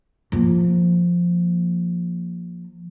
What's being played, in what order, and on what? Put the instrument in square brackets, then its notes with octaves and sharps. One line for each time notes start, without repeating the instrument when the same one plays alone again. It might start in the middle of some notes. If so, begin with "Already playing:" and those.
[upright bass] F3 A#3